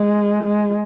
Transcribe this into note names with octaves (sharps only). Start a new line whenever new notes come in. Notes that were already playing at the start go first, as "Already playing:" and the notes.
Already playing: G#3
G#3